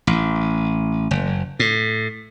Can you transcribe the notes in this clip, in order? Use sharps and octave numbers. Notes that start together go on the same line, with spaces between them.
A1
F#1
A2